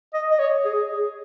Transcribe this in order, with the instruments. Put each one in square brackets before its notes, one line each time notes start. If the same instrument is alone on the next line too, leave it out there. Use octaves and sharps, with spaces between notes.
[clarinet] D#5
D#5
C#5
G#4
G#4